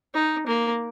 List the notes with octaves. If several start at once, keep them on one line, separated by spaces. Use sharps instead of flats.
D#4
A#3